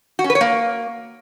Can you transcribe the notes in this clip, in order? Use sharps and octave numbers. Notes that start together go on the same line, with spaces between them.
F#4
C#4
B4
C#5
A#3